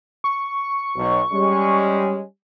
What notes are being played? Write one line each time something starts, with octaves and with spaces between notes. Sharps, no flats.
C#6
B1
G3 G#3 C#4